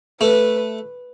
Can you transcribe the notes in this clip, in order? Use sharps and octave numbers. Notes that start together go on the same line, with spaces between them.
A3 B4